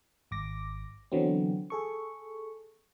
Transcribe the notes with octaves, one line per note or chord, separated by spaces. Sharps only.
G#1 D6 A#6
D3 E3 F#3 B3 C4
G#4 A4 C#6